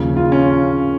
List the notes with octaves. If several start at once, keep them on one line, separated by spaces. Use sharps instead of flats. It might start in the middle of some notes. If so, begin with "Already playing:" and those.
Already playing: D#2 C#3 F3
F4
C#4